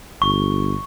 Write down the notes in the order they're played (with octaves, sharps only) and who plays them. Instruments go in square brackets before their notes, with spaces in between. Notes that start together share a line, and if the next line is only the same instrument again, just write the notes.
[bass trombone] G1 [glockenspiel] C#6